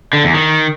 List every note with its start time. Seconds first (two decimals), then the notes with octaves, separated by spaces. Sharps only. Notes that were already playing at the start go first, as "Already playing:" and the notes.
0.13 D3
0.24 E2
0.34 D#3